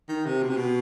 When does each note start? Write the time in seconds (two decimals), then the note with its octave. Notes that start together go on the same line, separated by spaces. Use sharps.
0.09 D#3
0.26 C3
0.43 B2
0.49 C3
0.57 B2